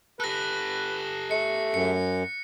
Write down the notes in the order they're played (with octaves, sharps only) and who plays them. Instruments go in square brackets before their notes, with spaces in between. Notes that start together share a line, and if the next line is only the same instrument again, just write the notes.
[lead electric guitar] G4 A4 [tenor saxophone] B4 [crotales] F#6 A#6
[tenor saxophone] A3 [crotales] C#7
[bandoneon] F#2 [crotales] C#7